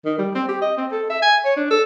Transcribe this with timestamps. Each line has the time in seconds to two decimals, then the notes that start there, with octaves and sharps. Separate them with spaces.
0.05 D#3
0.18 G3
0.35 C4
0.48 G4
0.61 D#5
0.77 C4
0.92 A4
1.10 E5
1.22 G#5
1.45 C#5
1.57 D4
1.70 A4